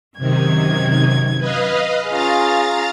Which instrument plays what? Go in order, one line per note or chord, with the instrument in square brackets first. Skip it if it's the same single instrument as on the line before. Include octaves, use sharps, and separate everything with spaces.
[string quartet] F#2 G#6 [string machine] C3 D#3
[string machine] B4 D#5 F5
[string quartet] C#4 F4 G#4 [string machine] F5 A#5 A6